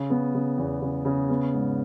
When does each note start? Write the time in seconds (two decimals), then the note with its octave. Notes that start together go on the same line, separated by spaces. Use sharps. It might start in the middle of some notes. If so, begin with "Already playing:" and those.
Already playing: C#3
0.10 B3
0.34 C#3
0.58 E2
0.82 C#3
1.05 C#3
1.30 B3
1.54 G#2